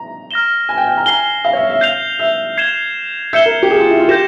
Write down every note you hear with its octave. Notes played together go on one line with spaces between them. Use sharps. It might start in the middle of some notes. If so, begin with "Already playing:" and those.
Already playing: A#5
F6 A#6 E7 G7
G#5
G5
G5
A#5
G#5 F6 C7 G7
F5
C#5
E5
E5
G6 C7 F7
E5
G#6 C7 E7 G7
E5 G6 C#7 E7 G7
A#4
G4
G#4
F4
E4
F4
G4 G6 A#6 E7